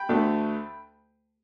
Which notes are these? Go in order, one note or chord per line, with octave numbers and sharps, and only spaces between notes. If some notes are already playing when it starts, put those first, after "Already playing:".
Already playing: G5 B5
D2 D3 A3